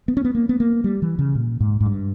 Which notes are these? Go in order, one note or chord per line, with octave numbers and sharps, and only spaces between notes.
B3
C#4
B3
A#3
B3
A#3
G3
E3
C#3
A#2
G#2
G#2
G2